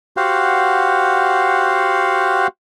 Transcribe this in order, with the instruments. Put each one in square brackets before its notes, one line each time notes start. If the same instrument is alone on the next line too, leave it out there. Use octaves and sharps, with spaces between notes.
[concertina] F#4 G4 C5 F5 F#5